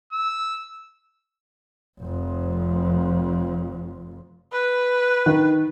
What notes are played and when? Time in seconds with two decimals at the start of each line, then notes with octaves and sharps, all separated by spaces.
0.12 E6
2.00 F1 F2
4.53 B4
5.26 D#3